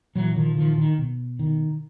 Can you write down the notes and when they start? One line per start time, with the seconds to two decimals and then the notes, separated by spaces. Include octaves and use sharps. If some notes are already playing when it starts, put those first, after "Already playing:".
0.16 A#2 E3 F#3
0.36 D#3 F3
0.57 D#3 F3
0.78 D#3
0.99 B2
1.39 D#3